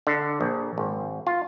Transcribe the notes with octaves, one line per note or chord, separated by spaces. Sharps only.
D3
A#1
G#1
F4